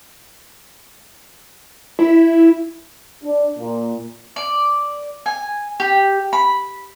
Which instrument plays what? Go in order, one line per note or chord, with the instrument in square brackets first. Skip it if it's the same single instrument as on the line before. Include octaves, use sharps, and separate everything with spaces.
[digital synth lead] E4
[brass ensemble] D4
A#2
[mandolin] D5
G#5
G4
B5